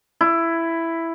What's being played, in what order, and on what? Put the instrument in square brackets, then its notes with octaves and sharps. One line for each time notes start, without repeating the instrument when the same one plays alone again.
[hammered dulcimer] E4